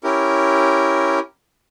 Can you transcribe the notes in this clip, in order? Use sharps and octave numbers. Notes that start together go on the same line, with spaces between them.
C#4 E4 G4 A#4